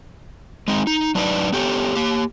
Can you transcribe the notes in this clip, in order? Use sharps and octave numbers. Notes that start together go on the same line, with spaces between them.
G#3 C4 D#4
D#4
F#3 D4 D#4 B4 D5
B3 G4 A4 C#5
A#3 G4